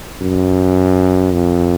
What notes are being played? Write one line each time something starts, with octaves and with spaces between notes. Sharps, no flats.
F#2
F2